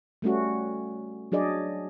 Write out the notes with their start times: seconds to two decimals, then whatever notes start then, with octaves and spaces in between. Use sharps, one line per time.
0.22 G3 A3 C#4 F#4
1.32 F#3 D4 G#4 D5 D#5